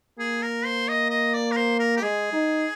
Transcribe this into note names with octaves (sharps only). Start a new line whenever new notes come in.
A#3 G#4
A#4
C5
D#5
D#5
D5
A#4
C5
A#4
G4
G#3 G#4
D#4